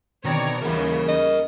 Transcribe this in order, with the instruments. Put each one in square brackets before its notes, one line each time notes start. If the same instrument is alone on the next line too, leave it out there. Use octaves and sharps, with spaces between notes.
[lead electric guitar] B2 [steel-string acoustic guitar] D3 D#3 C4 [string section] C#5 D5 A#5
[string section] D#2 C#3 [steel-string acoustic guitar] E3 E4 [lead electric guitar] A#4 F#5
[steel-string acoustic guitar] B3 [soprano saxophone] D#5